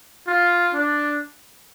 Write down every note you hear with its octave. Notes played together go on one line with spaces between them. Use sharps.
F4
D4